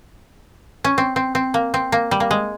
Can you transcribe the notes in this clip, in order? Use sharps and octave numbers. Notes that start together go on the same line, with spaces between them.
C#4
C4
C4
C4
A#3
C4
A#3
G3
A#3
G#3